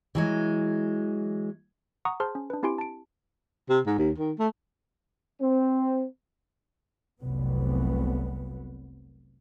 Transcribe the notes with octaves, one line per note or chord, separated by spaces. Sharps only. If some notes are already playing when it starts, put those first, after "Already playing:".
E3 F#3 G#3
F#5 A#5 C#6 D#6
G#4 C5 A5 C6 F6
C#4
D4 B4
C4 E4 G4 G#5 C6 D7
A5 D7
C3
G#2
D#2
D#3
A3
C4
F1 C2 F#3 B3